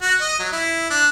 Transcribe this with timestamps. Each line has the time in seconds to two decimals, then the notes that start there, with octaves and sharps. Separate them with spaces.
0.02 F#4
0.20 D#5
0.39 F#3
0.52 E4
0.90 D4